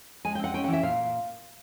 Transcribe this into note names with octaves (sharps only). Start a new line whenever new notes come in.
G#3 G#5
G5
C4 F#5
C#4 G5
F#5
E3
E5
A#2 F5